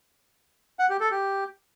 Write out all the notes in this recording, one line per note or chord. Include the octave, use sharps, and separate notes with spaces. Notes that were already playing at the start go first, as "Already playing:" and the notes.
F#5
G4
A4
G4